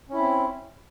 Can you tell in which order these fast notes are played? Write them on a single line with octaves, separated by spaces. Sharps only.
C#4 E4 C4